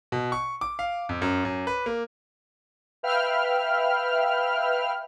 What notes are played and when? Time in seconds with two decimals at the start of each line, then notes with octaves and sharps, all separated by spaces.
0.12 B2
0.32 C#6
0.61 D6
0.79 F5
1.09 F2
1.22 F#2
1.45 F#2
1.67 B4
1.86 A#3
3.03 B4 E5 F5 G5 B5 F6